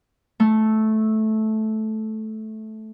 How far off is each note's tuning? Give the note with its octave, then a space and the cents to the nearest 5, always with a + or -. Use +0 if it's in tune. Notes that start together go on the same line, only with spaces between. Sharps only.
A3 -10